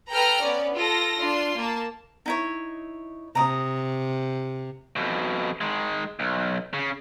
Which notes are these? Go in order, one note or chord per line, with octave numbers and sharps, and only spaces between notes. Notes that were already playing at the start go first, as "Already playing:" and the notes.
A4 B4 G5 A#5 F6
B3 C#4 D5
F4 A4 A#6
D4 F4 C6
A#3 A5
D#4 E4 C#5
C3 A#5 D#6
F2 B2
D#3 G#3
B1
C#3